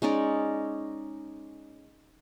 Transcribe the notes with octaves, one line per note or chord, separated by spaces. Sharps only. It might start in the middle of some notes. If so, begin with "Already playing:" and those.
G#3 C#4 D#4 D5